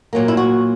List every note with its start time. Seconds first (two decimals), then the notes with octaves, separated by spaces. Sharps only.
0.13 A#2 F#3 A#3
0.28 E4
0.37 F#4